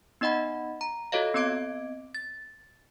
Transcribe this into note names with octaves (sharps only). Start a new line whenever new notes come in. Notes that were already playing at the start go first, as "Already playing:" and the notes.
B3 D#4 D#5 F#5 B5
A#5
F4 F#4 A4 C#5 D#5 F5
B3 C4 D#5 D6 G#6 D7
A6